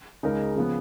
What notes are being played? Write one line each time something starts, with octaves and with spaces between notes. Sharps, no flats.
C#2 C#3 G#3 D#4 A#4
C#3 F3 B3